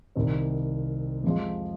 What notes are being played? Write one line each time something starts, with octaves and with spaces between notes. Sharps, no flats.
C2 C3 D#3 C4
F2 C3 F3 G#3